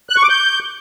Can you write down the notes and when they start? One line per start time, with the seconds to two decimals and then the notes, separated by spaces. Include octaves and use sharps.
0.10 F#6
0.16 C#6
0.23 D6
0.30 G6